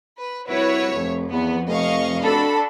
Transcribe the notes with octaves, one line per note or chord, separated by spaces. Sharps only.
B4
C2 E4 F#4 B4 C#5 E5
F1 F2
E2 B3
F1 D#5 F5 C#6
D4 F#4 A4 B5